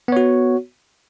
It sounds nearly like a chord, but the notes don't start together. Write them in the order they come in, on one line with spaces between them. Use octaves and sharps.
B3 C#5 F#4